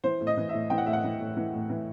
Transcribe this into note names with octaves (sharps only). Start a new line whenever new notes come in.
E3 C5
A2
D#5
E3
E5
A2
E3 G5
F#5
A2 E5
F#5
E3
A2
E3
A2
E3